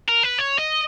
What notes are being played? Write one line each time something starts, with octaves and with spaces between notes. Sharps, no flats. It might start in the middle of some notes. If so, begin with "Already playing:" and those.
A#4
B4
C#5
D#5